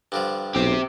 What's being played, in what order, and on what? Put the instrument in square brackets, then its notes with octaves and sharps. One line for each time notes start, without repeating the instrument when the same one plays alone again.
[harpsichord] G2 D3 F3
[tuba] B1 [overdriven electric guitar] C4 G4